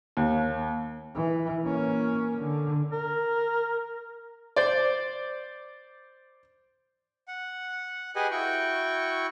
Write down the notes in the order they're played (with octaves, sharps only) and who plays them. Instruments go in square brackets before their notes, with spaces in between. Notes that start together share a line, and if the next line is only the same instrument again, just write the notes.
[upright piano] D#2
[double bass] E3
A#3 C#4
D3
[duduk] A#4
[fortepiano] C5 D5
[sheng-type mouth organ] F#5
G4 G#4 B4 D#5 F#5 G#5
E4 F#4 G5 C#6